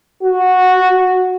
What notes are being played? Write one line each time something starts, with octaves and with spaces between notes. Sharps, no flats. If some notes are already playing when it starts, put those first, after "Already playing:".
F#4